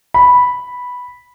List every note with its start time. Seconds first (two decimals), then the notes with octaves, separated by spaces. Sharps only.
0.14 B5